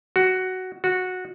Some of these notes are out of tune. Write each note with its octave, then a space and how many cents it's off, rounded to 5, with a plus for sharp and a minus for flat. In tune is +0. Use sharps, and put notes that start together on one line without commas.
F#4 +10
F#4 -10